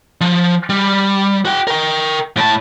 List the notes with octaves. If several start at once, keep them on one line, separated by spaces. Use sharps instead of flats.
F3
G3
F#4 G5
A#4 G5
A2 A5